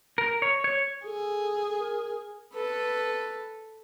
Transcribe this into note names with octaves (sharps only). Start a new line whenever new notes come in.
A#4
C#5
C#5
G#4 A4
A#4
A4 B4